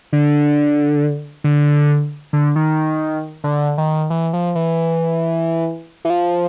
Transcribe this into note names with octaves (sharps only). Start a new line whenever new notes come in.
D3
D3
D3
D#3
D3
D#3
E3
F3
E3
E3
F3